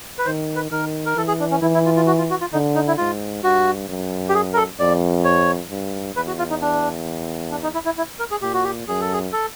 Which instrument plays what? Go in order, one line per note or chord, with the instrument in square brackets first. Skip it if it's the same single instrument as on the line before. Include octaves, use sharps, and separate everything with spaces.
[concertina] B4
[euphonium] D#3 [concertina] C5
[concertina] B4
[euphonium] D#3 [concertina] A#4
[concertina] A#4
[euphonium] E3 [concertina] A4
[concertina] G#4
D4
C#4
[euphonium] E3 [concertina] E4
[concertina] E4
F4
F4
F#4
F4
F#4
F4
[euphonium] D3 [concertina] D#4
[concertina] D#4
E4
[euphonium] G#2 [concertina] F4
[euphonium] G2 [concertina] F#4
[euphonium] F#2
[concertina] G4
G#4
A#4
A4
[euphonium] F2 [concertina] D5
[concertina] C#5
[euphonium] G2
[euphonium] E2 [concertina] B4
[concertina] F#4
F4
D#4
D4
D4
D#4
E4
E4
E4
A#4
G#4
[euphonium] A#2 [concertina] G4
[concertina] F#4
G4
[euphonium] F#2 [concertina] G#4
[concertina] A4
G#4
A4